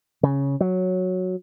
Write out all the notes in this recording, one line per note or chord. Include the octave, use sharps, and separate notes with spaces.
C#3
F#3